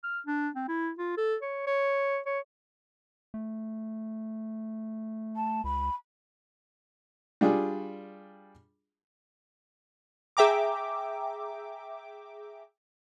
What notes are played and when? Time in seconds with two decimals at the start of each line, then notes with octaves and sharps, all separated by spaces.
0.03 F6
0.27 D4
0.56 C4
0.69 E4
0.98 F4
1.18 A4
1.42 C#5
1.67 C#5
2.26 C#5
3.34 A3
5.35 A5
5.64 C#2 B5
7.41 G3 D4 F4 G#4
10.37 G#4 E5 G5 A#5 D6